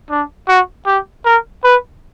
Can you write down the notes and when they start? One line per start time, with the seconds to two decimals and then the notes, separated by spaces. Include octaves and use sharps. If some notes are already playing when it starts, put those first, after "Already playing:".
0.10 D4
0.48 F#4
0.86 G4
1.25 A#4
1.64 B4